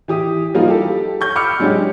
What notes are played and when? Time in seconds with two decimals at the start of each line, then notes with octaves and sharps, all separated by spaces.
0.08 E3 G4 D#6
0.54 E3 F3 G3 A#3 D#4 F4
0.68 G4 A4
1.21 C#6 G6
1.36 B5 D6 E6 F6 C#7
1.59 F#3 G#3 C#4 D4 F#4 G4